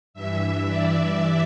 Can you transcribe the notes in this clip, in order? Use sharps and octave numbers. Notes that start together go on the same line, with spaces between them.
G2 E3 E5
D5